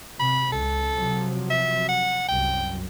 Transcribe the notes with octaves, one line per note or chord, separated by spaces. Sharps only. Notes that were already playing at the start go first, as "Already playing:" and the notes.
C3 B5
C#2 A4
C3 F3 F#3
E5
F#5
C2 F#2 G5